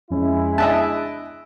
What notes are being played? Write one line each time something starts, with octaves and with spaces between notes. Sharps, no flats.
F2 F3 G#3 C#4 E4
D4 D#5 E5 A5 F#6 D7